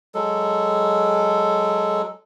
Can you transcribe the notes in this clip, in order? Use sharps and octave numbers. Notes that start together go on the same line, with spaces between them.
F#3 G#3 A4